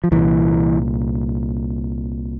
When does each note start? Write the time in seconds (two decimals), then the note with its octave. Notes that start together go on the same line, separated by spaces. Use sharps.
0.04 F3
0.11 C2 A#2 E3